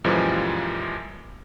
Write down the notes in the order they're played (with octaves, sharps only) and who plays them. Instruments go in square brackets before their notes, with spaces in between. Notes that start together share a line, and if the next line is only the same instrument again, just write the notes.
[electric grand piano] F#2 A#2 E3 F3 G3 G#3